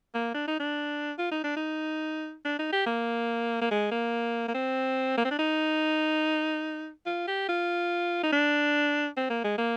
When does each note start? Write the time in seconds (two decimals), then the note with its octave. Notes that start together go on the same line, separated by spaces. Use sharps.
0.14 A#3
0.34 D4
0.48 D#4
0.60 D4
1.18 F4
1.31 D#4
1.44 D4
1.56 D#4
2.45 D4
2.59 D#4
2.72 G4
2.86 A#3
3.61 A#3
3.71 G#3
3.91 A#3
4.48 A#3
4.54 C4
5.17 A#3
5.25 C4
5.31 D4
5.39 D#4
7.06 F4
7.28 G4
7.49 F4
8.23 D#4
8.32 D4
9.17 C4
9.30 A#3
9.44 G#3
9.58 A#3